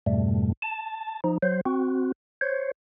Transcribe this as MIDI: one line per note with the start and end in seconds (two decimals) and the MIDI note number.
0.06 0.52 41
0.06 0.52 44
0.06 0.52 47
0.06 0.52 55
0.06 0.52 57
0.62 1.20 81
1.24 1.38 53
1.24 1.38 63
1.43 1.61 54
1.43 1.61 72
1.66 2.12 60
1.66 2.12 66
2.41 2.71 72
2.41 2.71 73